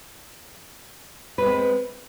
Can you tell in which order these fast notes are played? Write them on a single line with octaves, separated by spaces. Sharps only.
B4 G#3 C4